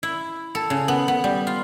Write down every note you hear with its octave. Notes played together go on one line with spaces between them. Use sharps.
E4
A4
C#3
B3
B3
G3
F4